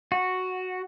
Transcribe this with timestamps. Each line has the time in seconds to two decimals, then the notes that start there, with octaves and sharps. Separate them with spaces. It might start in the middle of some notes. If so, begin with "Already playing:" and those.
0.12 F#4